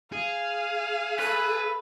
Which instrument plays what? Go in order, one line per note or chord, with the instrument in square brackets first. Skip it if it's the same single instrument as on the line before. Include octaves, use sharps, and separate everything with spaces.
[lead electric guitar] G#4 [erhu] F5
[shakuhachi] A4 [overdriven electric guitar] B4